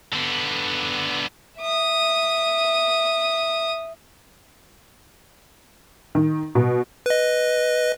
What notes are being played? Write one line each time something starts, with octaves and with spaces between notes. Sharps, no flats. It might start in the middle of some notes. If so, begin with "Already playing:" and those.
D3 B3
E5 D#6
D#3
B2
B4 D#5